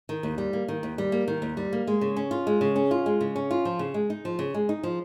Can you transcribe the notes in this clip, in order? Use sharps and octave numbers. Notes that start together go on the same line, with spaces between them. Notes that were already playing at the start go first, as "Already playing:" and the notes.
D#3
D#2
G3
A#3
D#3
D#2
G3
A#3
D#3
D#2
G3
A#3
G#3
C#3
C#4
F4
G#3
C#3
C#4
F4
G#3
C#3
C#4
F4
F3
C#3
G#3
D#4
F3
C#3
G#3
D#4
F3